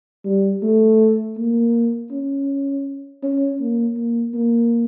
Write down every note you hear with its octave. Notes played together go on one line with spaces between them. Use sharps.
G3
A3
A#3
C#4
C#4
A#3
A#3
A#3